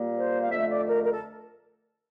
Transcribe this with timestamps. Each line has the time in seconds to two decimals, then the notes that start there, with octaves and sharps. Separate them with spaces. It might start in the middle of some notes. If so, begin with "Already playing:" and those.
Already playing: A#2 G3 A#3
0.17 C5
0.40 F5
0.51 F2 D3 A3 E5
0.68 D5
0.85 A#4
1.02 A#4
1.11 A4